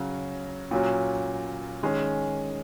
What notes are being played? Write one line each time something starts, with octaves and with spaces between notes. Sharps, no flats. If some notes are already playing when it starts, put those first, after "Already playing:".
Already playing: C#3 F#3 C#4 F#4
A#2 F#3 C#4 F#4
D#3 G#3 C#4